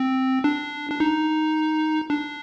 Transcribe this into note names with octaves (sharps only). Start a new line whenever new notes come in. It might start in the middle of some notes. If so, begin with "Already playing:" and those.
Already playing: C4
D4
D4
D#4
D4